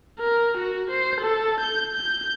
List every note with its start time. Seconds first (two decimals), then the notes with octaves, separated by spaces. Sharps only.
0.19 A#4
0.57 F#4
0.91 C5
1.21 A4
1.60 G6
1.95 G6